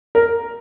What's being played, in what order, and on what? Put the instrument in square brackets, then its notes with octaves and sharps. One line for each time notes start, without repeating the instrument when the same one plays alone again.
[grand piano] A#4